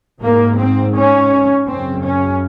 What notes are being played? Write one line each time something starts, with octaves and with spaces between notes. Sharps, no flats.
G#2 A#3
C4
C#4
F#2 C#3 C4
C#4